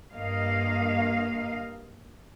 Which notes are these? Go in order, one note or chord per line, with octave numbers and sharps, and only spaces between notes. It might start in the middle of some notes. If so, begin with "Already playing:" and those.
G2 A#3 D#5 F5